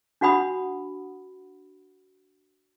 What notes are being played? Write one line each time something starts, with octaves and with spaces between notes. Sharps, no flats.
D4 F#4 F#5 B5 D#6